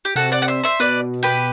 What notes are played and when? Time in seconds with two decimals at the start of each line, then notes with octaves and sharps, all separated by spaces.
0.05 G4
0.15 C3 F#4 A4
0.32 D5 F#5
0.42 F#5
0.48 C5 E5
0.64 C5 E5
0.80 B2 B4 D5
1.23 G4 B4